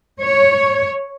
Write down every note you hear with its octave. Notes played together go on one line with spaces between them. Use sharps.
C#5